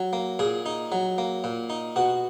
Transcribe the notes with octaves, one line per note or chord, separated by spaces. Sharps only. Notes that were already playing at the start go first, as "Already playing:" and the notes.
Already playing: F#3
A#3
A#2 G#4
D#4
F#3
A#3
A#2
D#4
B2 F#4